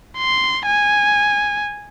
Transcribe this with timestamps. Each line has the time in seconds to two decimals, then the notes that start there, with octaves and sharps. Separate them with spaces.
0.18 C6
0.66 G#5